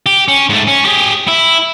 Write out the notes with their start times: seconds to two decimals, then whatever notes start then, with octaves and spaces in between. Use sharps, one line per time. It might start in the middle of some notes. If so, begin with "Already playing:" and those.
0.06 G4
0.28 C#4
0.49 G#2 A3
0.68 C#4
0.85 G4 G#4
1.28 E4